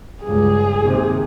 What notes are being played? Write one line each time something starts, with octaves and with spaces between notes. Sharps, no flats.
C#2 G2 G#4
D#2 C3